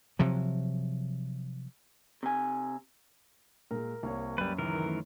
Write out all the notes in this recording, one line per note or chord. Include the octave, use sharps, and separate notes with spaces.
C3 F3 F#3
C3 G#5
A#2 G#3 A#4
C2 A#3 C#5
F#2 G3 B4
C#2 D#3 E3 A#4
A3